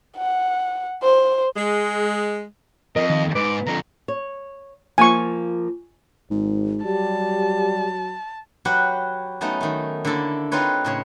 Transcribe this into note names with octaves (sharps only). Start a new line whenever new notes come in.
F#5
C5
G#3
F2 A#4 D#5
D#3
G#2 B4 D6
F2 D3 A#5
C#5
F3 A#3 F4 G#5 C#6
G#1 G#2
F#3 G3 G4 A5
F#3 F#4 G4 B4 F#5
F#3 A3 B3 C#4 D#4
D#3 A3
D3 A#3 E4 A4
C4 D#4 F4 B4 C#5
A2 C#3 C#5